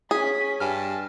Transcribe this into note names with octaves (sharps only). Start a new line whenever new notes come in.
C#4 G#4 B6
G2 G#5 A5 F6